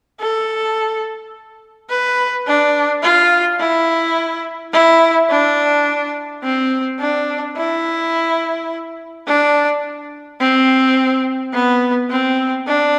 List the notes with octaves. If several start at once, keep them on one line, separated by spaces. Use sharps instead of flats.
A4
B4
D4
F4
E4
E4
D4
C4
D4
E4
D4
C4
B3
C4
D4